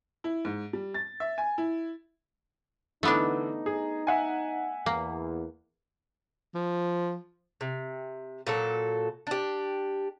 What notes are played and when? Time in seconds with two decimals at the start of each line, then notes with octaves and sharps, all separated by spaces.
0.24 E4
0.45 G#2
0.73 G3
0.94 A6
1.20 E5
1.38 G#5
1.58 E4
3.03 D3 E3 A3 B3 D4 D#4
3.66 G#4
4.07 E5 F#5 G#5
4.86 E2 A#3
6.55 F3
7.61 C3
8.47 A#2 F#3 A4
9.27 D4 G4